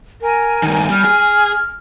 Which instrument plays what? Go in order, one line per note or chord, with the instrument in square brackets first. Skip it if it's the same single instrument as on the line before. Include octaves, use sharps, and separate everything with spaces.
[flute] A#4 [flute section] G#5
[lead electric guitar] G2 D#3
[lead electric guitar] G3 [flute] F6
[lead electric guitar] G#4